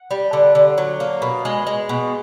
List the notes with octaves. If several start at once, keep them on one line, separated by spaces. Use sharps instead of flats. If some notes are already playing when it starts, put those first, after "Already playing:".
Already playing: F#5
G3
D3
D3
F#3
A#3
B2
G#3
G#3
B2